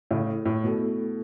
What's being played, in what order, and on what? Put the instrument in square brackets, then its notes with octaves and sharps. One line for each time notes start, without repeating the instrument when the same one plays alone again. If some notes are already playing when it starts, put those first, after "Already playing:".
[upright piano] A2 C#3 [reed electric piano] A3 E4 A4
[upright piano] A2
[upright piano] B2 [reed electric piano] A3 E4 A4